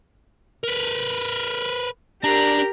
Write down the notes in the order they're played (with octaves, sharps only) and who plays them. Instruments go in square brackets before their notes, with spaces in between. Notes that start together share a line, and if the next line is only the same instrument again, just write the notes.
[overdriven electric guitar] A#4 B4
[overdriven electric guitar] D4 [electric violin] G4 A#4 [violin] A#5